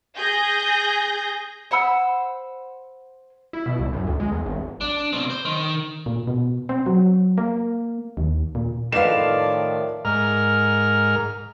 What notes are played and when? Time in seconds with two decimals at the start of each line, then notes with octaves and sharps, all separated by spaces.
0.17 G#4 G6 A#6
1.71 C5 F#5 B5 E6
3.53 E4
3.66 B2
3.79 C2
3.93 F#2
4.06 D2
4.20 G#3
4.32 E2
4.46 G#1
4.81 D4
5.13 B2 C4
5.30 C5
5.45 D#3
6.06 A#2
6.27 B2
6.69 C4
6.86 F#3
7.38 A#3
8.17 D#2
8.55 A#2
8.92 A2 D#3 F3 A#4 B4 D5 F5 E7
10.05 G#2 A#4 F6